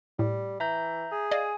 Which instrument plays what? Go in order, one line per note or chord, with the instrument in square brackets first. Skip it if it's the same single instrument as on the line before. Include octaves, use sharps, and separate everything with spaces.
[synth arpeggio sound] A2 [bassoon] G3
[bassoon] E3 [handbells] E5 A#5 G6
[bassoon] G#4
[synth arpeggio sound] D5 D#5 F5 [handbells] G#5